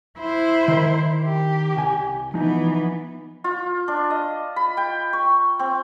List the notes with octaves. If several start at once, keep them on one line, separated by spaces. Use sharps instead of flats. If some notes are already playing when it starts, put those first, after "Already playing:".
E4 C5
D#3 A#4
G4
C2 G#5
E3 F3 B3 D#4
F4
D4
D#5
B5
G5
C#6
C4